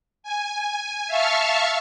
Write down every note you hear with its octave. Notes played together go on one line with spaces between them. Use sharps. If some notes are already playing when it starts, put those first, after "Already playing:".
G#5
E5 F5 A5 C#6 F6